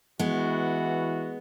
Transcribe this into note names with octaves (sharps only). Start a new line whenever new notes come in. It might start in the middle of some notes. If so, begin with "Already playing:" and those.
E3 G#3 B3 F#4